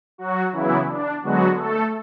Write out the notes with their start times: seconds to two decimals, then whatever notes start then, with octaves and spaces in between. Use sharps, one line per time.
0.18 F#3 F#4
0.53 C#3 E3 F#3 B3 E4
0.88 D4
1.23 D3 F#3 G#3 B3 F#4
1.57 A3 A4